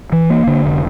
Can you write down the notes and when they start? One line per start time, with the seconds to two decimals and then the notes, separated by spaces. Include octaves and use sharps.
0.12 E3
0.30 A#3
0.47 D3
0.64 F1